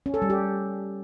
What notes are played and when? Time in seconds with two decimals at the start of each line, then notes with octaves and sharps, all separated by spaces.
0.06 C#4
0.14 A4
0.22 G3
0.30 G4